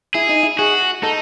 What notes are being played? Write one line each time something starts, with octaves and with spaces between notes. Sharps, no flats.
E4 G#4
D#4
E4
F#4 G#4
D#4 A4